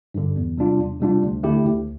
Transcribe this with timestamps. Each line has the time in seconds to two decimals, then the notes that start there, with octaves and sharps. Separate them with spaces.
0.14 G2 D3
0.36 E2
0.57 C3 G3 D4 F4
0.79 E2
1.01 C3 G3 D4 F4
1.23 D2
1.43 D3 A3 E4 G4
1.65 D2